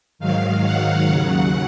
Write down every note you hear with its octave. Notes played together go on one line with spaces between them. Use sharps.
G#2 D#3 F#3 F5
F#5
D#2 C#3 F#3 F#5